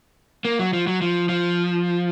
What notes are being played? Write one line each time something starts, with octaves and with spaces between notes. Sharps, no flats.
A#3
F#3
F3
F#3
F3
F3